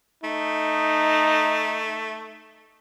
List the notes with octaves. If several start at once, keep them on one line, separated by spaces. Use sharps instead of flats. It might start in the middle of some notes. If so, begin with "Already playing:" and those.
A3 D#4